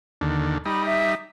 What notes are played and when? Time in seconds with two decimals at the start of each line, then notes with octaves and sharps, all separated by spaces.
0.21 D#2 D3
0.66 G3 D#4 B5
0.86 E5